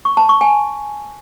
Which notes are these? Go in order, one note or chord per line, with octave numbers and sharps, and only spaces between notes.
C#6
A5
C#6
G#5